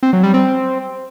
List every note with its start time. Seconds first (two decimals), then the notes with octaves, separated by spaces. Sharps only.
0.03 C4
0.13 F#3
0.23 G3
0.34 C4